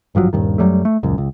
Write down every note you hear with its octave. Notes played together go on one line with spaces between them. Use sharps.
G#1 G2 F3 F#3
D#1 G2 D#3
F#2 F#3 G3 A3
A3
D#1 C#2 F#2
C#2